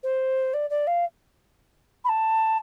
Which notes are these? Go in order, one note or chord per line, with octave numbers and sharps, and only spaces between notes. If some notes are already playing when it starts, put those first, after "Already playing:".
C5
D5
D5
F5
B5
A5